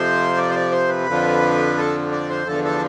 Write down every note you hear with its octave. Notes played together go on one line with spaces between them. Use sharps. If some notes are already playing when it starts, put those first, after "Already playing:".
Already playing: F2 C3 F3 C5
D5
C5
D5
C5
B4
F2 D3 F3
A4
D5
C5
E2 D3 F3 A4
A4